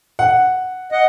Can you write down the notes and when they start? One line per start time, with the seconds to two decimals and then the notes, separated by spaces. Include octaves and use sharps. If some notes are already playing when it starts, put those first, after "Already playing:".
0.19 F#5
0.92 D#5 F#5